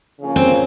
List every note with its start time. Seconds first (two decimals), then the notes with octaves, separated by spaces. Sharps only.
0.20 C#3 F3 A#3 C#4
0.36 C4